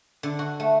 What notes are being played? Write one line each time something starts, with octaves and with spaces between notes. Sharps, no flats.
D3
F#4
A3